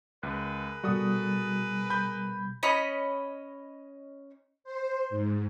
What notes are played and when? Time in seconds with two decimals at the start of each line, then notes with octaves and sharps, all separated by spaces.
0.23 C#2 G#4 A#4 B4 F#6
0.84 B2 G3 F#4 A4 D#6
1.90 B5 G6
2.63 C#4 C#5 D#5 B5
4.64 C5
5.10 G#2